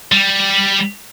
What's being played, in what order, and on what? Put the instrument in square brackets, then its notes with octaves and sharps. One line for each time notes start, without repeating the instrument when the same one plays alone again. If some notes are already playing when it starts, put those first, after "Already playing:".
[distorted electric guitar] G3